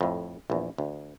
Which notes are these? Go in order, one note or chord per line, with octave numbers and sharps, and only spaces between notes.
F2 A2
A#1 E2
D2